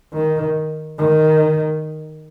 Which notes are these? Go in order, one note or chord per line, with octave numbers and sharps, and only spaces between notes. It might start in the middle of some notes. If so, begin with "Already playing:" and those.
D#3
D#3